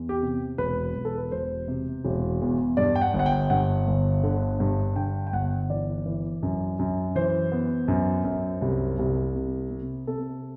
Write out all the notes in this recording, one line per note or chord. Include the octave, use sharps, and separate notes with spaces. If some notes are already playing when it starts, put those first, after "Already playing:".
Already playing: E2
G4
C3
E1 B4
E1
A4
B4
E1 C5
C3
E1
E2
G2 D5
G5
F#5
G1
F#5
G5
G2 F#5
G1
D3
G2
D3 G5
G5
G1 F#5
E3 D5
E3
F#2
F#2
E3 C5
B3
F#2
F#2
C2
C2
C3
C3
C3 A4